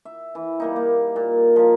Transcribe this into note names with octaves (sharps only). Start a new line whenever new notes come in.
E5
E3
G3 A#3 D#4
A#3
A#2
F3 A#4